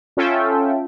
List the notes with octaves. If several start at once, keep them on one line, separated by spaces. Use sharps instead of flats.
C#4 F4 A4 E5 G5